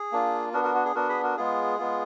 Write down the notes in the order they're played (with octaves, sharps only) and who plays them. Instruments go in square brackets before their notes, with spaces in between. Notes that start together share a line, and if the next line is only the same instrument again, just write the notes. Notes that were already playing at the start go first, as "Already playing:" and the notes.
Already playing: [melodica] G#4
A#3 D4 F4
B3 D4 F#4 A#4
F#4 A#4
F#4
G#4
B3 D4 F#4 A#4
G#4 B4
F#4 A#4
G#3 B3 F4 G#4
G#3 B3 F4